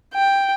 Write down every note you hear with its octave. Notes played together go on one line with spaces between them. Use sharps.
G5